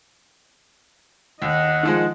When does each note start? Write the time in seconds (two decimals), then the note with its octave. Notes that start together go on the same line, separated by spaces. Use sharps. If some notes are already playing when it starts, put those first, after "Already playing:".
1.42 D#2 D#5 F#5
1.83 D#3 F3 G#3